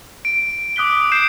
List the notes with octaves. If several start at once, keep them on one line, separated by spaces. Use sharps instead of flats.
D7
D6 D#6 F#6 B6 G7
G6 C7 D7 E7